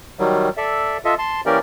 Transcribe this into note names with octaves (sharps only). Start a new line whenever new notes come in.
D#3 F#3 G3
A4 D5 E5
F4 A4 D#5 E5
A5 C6
E3 A#3 C#4 G4 A#4 D5